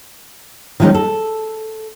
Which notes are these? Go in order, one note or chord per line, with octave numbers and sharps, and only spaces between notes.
D#3 F3 G#3 A#3 C#4 D#4
A4